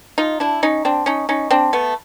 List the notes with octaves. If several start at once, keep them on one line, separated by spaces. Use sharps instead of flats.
D#4 F4
D4 E4
C#4 D#4
C4 D4
C#4 D#4
C#4 D#4
C4 D4
A3 B3